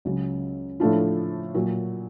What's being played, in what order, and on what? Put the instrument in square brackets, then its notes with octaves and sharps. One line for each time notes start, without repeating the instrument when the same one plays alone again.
[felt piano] C#2 C#3 F#3
A2 F3 A3 D4 F4
A#2 F#3